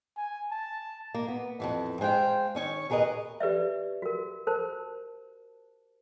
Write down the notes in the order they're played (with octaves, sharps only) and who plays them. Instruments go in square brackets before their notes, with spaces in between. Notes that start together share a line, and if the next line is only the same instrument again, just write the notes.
[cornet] G#5
A5
[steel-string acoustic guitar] A#3
B3
F2 G#2 E3
G#3 C5 F5 G5
D#3 C#4 C#5
D#2 G#4 A#4 B4 D#5
[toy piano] G4 B4 D5 E5
F#4 A#4
A#4 C5 A5